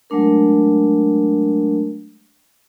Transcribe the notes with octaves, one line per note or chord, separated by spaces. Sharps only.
F#3 G#3 A3 D4 A#4